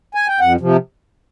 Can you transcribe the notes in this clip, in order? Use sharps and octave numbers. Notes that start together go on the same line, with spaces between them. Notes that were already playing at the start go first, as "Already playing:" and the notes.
G#5
G5
F2 F#5
C3 F3